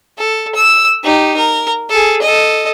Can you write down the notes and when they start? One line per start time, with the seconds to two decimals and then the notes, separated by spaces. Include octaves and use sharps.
0.18 A4
0.55 E6
1.04 D#4 G4
1.37 A#4
1.89 G#4 A4
2.22 A4 D#5